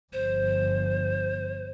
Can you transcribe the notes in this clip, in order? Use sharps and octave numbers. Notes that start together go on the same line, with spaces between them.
G1 F3 C5